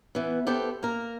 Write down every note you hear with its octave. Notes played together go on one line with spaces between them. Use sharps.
E3 B3
B3 G4 A4 C5
A#3 A#4